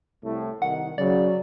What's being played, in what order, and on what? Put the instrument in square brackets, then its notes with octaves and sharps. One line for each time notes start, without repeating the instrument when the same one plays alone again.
[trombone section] C2 A2
[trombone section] C2 D#3 [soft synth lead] F#5
[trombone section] C#3 [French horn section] F#3 [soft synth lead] D5